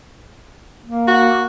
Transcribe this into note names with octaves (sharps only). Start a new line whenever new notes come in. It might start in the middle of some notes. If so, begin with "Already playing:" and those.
A#3
F#4